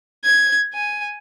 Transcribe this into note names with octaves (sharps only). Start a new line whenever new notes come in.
G#6
G#5